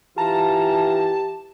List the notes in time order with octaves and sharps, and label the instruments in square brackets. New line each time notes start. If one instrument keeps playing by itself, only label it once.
[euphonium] E3 [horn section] F4 A#5 [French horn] G4 [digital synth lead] A5